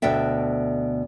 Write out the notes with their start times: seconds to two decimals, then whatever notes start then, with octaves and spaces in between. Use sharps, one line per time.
0.02 D2 B2 D4 A4 E5 G5